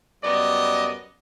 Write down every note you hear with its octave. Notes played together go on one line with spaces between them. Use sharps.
F#2 G3 B3 D5 D#5